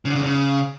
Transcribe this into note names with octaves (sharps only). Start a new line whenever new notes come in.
C#3
D3
C#3
E2
C#3